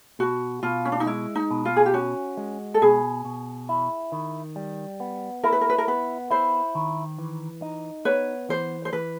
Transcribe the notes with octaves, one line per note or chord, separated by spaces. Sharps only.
B2 F#4
B2 F4
C#4
D4
D#4
G#3 E4
D#4
B2
F4
G#4
G4
C#4 F#4
G#3
A4
B2 G#4
B2
E4
D#3
G3
B3
E4 A#4
B4
A#4
B4
A#4
B3 B4
E4 C5
D#3
E3
D#4
B3 B4 C#5
E3 C5
C5
E3 B4